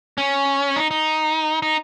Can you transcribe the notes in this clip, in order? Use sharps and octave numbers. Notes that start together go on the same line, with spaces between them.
C#4
D#4
D#4
D#4